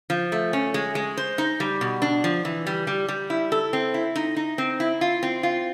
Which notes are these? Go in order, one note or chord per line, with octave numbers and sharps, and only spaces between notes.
F3
A3
C#4
G#3
G#3
C5
D#4
G3
B2
D4
F3
E3
G3
G3
G3
E4
A4
C4
E4
D#4
D#4
C4
E4
F4
C4
F4